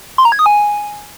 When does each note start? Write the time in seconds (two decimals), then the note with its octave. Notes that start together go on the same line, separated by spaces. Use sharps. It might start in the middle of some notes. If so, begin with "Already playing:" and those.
0.18 C6
0.25 A#5
0.32 G#6
0.39 D#6
0.46 G#5